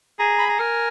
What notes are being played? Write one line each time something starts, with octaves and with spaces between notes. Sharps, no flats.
G#4 A#5
B5
A#5
A#4 G#5